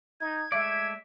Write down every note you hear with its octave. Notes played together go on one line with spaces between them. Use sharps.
D#4 G#6
G#3 A3 D5 E5